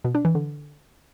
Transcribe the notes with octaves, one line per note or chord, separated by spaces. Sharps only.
B2
D4
E3
D3